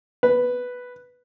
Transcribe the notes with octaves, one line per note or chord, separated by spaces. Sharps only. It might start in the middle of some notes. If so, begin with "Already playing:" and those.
B4